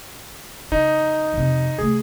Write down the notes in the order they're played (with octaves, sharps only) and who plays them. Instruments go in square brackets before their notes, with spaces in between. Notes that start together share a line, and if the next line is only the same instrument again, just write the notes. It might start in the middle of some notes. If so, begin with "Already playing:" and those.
[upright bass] C#3 [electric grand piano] D#4
[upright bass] F2 C3
[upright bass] C3 A3 [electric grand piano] G#4